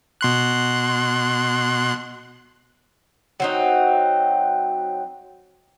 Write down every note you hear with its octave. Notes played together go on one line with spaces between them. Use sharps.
B2 C6 F#6
F#3 C4 D#4